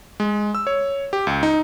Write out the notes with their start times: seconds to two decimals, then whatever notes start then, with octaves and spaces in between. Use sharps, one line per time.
0.20 G#3
0.55 E6
0.67 C#5
1.13 G4
1.27 C#2
1.43 D#4